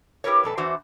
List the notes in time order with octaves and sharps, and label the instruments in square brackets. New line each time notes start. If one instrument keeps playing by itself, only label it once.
[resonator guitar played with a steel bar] E4 G4 G#4 A#4 B4 C#5
F2 A#2 A4 B4
E2 E3 D4 F#4 C5